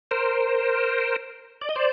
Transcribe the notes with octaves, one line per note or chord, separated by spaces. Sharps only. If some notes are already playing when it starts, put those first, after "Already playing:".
A#4 C5
D5
D#5
C5 D5